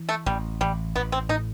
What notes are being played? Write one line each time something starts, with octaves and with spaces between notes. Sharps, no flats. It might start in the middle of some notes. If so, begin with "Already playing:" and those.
Already playing: E3
A3
A1 G3
A1 G3
A1 B3
C4
A2 D#4